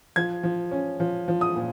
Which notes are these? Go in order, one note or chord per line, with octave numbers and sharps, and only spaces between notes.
F3 G#6
F3
C#4
F3
F3
D#6
A#2